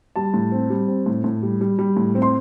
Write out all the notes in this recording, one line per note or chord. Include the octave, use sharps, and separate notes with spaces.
G3 A5
A2
C4
G3
C4
A2
A2
G3
G3
G3
A2
C4
C6